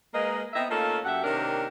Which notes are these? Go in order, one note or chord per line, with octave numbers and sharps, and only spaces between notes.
G#3 A#3 A#4 B4 D#5
B3 C4 A#4 D#5 E5
A3 A#3 C#4 D#4 F4 A4
F#2 G4 A4 E5 F#5
C3 D#3 A#3 C#4 D4 A#4